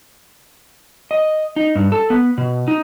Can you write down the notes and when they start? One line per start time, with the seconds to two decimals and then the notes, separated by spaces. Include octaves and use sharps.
1.11 D#5
1.56 D#4
1.75 G2
1.92 A4
2.10 B3
2.38 B2
2.68 D#4